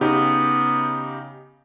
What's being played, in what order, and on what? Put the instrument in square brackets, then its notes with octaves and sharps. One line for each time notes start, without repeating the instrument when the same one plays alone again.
[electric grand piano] C#3 D#4 G4 [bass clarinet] B3